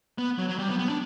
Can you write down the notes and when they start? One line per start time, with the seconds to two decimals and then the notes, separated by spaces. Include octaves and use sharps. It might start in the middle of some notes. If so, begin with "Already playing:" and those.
0.18 B3
0.38 F#3
0.49 F#3
0.58 G3
0.69 B3
0.79 B3
0.89 D4